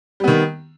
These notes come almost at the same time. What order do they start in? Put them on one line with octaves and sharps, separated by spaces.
G3 B3 D#3